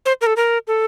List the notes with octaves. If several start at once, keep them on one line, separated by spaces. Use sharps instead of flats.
C5
A#4
A4
A#4
A4